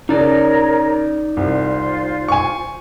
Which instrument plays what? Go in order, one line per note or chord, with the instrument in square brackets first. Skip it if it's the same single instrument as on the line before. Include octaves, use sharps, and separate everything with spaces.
[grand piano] C#3 [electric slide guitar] D#4 D5 [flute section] A#4 C#5 A#5
[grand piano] C2 [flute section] F4 C5
[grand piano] G#5 C#6